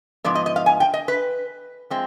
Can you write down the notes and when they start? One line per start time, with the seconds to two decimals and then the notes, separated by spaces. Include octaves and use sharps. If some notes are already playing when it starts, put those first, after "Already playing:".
0.24 G#2 F3 B3 D5
0.35 D#5
0.46 D#5
0.56 F5
0.66 G#5
0.80 G5
0.94 D#5
1.08 B4
1.90 F3 G#3 C4